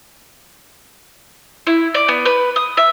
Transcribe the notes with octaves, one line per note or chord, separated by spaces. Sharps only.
E4
D5
B3
B4
D#6
E5